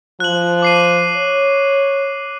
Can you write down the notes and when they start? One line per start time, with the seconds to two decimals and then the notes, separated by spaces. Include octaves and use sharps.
0.20 F3 F#6 F#7
0.62 D6 C7 D#7
1.16 C#5